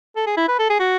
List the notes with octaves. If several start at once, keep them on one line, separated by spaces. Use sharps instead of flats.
A4
G#4
E4
B4
A4
G#4
F#4